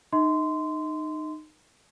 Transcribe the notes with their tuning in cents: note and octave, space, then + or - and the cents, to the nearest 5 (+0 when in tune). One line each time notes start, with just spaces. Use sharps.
D#4 -20 D#5 +45 C6 -20